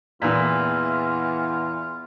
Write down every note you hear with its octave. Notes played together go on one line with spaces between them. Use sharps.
E2 A#2 E3 F4